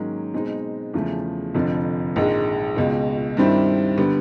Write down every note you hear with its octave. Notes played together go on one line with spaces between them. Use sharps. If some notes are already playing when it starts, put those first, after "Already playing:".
Already playing: G#2 D#3 F#3 A#3 C#4
B2 G#3 C4 D#4
E2 C#3 F3 A3
F1 F2 D3 F3
A#1 G#2 D#3 G#3
C#2 B2 G#3
G2 D#3 G3 C4 E4
D3 G3 B3